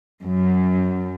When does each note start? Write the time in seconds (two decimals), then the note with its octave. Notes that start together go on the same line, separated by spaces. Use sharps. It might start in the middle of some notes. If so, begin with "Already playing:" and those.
0.23 F#2